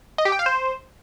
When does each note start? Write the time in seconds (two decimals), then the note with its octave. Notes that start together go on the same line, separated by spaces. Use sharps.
0.18 D#5
0.25 G4
0.32 G5
0.39 F5
0.46 C5